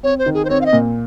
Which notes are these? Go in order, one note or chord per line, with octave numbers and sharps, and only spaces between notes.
C4 C#5
C5
D#3
G#4
C5
C4 C#5
F5
D#5
A#2